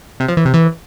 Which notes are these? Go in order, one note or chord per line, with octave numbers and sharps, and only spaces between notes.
C3
F3
E3
C3
E3